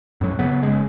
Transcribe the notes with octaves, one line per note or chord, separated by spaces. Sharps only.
F#2 A2 F#3
C#3 F#3 B3
F#1 C#3 G#3